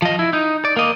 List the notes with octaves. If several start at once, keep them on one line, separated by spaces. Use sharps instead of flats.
F3 D#5
E4
D#4
D5
A#3 D#5